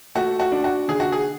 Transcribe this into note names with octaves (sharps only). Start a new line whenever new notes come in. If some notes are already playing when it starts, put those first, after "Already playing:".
A3 F#4
F#4
D4
F#4
D3 G#4
F#4
G#4